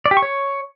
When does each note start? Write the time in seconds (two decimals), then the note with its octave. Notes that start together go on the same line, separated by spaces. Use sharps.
0.06 D5
0.11 G4
0.17 C#6
0.22 C#5